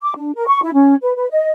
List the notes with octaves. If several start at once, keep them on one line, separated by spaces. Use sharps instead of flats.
D6
D4
A#4
C#6
E4
C#4
B4
B4
D#5